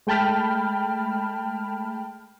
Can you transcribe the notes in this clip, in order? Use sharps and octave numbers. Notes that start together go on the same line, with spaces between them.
G#3 A3 G5 A5 B5 F6